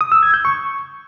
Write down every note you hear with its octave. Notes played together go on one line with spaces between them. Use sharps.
D#6
E6
G#6
G6
C#6